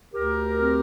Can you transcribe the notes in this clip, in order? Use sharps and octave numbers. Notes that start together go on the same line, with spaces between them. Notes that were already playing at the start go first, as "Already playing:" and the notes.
D2 G4 A#4
C4